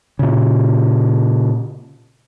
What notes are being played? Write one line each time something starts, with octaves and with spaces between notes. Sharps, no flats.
A#2 C#3